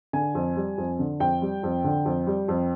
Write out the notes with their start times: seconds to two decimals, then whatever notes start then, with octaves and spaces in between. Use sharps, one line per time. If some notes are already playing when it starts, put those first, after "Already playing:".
0.13 D3 G#5
0.35 F2
0.56 G3
0.78 F2
0.99 D3
1.20 F2 G5
1.42 G3
1.63 F2
1.84 D3
2.05 F2
2.27 G3
2.48 F2